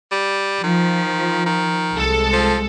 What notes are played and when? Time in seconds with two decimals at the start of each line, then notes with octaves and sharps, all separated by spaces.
0.12 G3
0.64 D#3 F3
1.46 D#3
1.94 C2 G#3 A4
2.33 F3